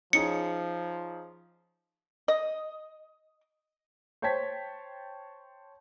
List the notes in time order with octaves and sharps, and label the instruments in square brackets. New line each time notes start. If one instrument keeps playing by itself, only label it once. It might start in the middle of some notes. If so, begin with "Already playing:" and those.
[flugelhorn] F3 [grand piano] C#4 D#4 G#4 [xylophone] C#7
[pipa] D#5
[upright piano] C5 C#5 G5 A5 G#6 B6